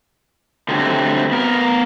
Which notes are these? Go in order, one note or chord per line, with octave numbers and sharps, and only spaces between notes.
D3 D#3 F#3 G3 A3 C4
B3 A#4